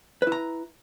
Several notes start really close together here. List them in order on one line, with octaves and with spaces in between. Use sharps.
B4 E4 A#5